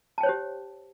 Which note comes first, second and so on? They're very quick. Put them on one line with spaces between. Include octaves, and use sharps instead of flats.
A5 G5 C#5 C5 G4